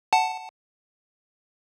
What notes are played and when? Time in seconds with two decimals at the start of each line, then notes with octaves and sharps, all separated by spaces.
0.13 F#5 A5